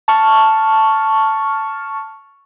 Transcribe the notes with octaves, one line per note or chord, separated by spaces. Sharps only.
A5 C#6 F6